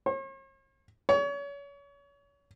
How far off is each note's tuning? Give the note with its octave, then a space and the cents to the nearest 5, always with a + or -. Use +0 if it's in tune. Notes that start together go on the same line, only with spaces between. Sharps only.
C#5 -45
C#5 +35